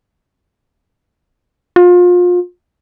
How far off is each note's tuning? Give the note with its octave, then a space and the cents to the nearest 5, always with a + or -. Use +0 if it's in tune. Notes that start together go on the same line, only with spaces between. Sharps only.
F4 +30